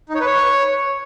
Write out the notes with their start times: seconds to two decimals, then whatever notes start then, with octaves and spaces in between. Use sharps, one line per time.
0.09 D#4
0.15 C#5
0.20 B4
0.26 C#5